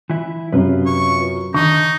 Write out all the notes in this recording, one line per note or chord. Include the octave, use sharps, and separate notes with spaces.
E3 E4
F#2 C3 F4 B4
C#6
D3 D#3 D#4 C#6